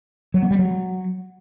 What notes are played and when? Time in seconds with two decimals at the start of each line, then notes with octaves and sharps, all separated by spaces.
0.34 F#3
0.42 B3
0.51 G3
0.59 F#3